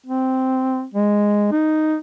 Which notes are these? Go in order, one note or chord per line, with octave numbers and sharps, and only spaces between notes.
C4
G#3
D#4